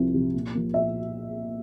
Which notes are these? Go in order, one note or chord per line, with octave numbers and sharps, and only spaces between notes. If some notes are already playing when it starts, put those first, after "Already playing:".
Already playing: C2 C3 F3
C3 F3
A#2
F3 A#3
A#2 E5